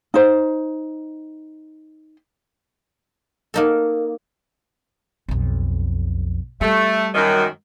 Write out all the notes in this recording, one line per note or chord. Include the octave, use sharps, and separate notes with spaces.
D#4 C5
A#3 D#4 A4
B1 F2
G3 A3
F#2 D#3